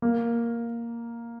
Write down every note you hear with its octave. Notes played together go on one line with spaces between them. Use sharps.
A#3